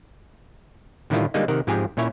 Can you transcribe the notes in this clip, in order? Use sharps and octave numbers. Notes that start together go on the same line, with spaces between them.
A2 D3 D#3 G3 E4 F4
D3 G3 G#3 A#3 D#4
C3 D#3 A#4 F#5
G#2 F3 C4 G4 G#4 G#5
A#2 C#4 E4 C#5 E5